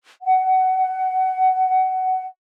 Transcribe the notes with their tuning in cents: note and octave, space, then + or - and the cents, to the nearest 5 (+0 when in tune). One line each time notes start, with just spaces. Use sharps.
F#5 +20